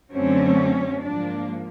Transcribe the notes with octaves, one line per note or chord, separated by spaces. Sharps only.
F#2 D3 F#3 A3 C4 C#4
G#2 F3 A#3 D4